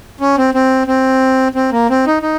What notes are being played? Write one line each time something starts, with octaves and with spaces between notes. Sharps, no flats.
C#4
C4
C4
C4
C4
A#3
C4
D#4
D#4